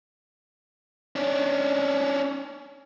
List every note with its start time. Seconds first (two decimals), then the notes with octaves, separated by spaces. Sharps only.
1.16 C#4 D4